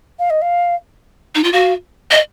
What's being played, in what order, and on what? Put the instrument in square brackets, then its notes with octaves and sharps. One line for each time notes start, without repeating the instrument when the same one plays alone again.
[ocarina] F5
D#5
F5
[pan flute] D#4
F4
[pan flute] F#4 [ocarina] F5
[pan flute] D#5